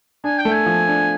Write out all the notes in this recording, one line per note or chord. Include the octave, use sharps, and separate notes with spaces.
D4 G#5
G5
A3
G#5
F3
D4